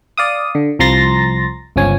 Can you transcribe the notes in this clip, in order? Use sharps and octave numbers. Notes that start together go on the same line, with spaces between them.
D5 F5 D#6
D3
C2 F3 A#5 C6 A6 A#6
G1 C#2 F3 C#4 G#5